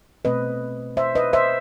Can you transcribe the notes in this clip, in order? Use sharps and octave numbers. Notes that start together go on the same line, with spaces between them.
B2 A3 C4 B4 D#5
C5 E5
B4 D#5
C5 E5